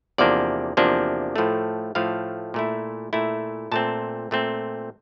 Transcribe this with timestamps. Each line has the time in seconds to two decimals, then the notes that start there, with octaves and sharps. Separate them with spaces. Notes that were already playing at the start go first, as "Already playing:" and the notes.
0.18 E2 C3 F3 A#3 D4 D5
0.77 E2 C3 F3 A#3 D4
1.36 A2 F3 A3
1.95 A2 F3 A3 F5
2.54 A#2 A3 E4
3.13 A#2 A3 E4
3.72 A#2 A3 C4 A5
4.31 A#2 A3 C4